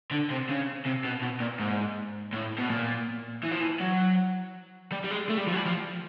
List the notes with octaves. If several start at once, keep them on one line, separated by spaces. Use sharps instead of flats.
D3
C3
C#3
C3
B2
B2
A#2
G#2
A2
B2
A#2
E3
F3
E3
F#3
G3
G3
G#3
A3
G3
F3
F#3
G3
F3